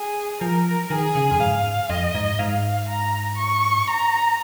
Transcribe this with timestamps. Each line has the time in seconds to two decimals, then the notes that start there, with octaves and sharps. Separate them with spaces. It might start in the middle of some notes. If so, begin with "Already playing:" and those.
Already playing: G#4
0.41 F3 A#4
0.90 D#3 G#4
1.15 C#3
1.31 F2
1.40 G#2 F5
1.89 F2 D#5
2.15 G#2
2.38 G#2 F5
2.89 A#5
3.38 C#6
3.87 A#5